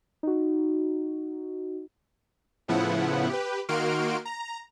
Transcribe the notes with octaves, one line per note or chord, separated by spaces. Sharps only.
D#4 F#4
A2 C#3 F3 B3 E4 F#5
G4 B4
D#3 A#3 F#4 C6 F6 D7
A#5